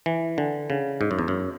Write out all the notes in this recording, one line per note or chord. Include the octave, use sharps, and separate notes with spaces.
E3
D3
C#3
G#2
F#2
E2
F#2